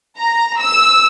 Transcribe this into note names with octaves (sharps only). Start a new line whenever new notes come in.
A#5
E6